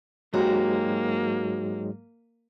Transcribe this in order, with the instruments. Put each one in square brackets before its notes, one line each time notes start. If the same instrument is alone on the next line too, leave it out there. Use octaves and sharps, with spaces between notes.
[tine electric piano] G#2 F#3 G#3 [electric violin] A#3 [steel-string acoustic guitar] F#4 G4